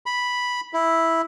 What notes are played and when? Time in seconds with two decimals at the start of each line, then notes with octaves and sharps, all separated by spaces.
0.06 B5
0.73 E4